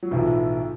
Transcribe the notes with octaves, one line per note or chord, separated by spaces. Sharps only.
F#3
B1 A2 E3 F3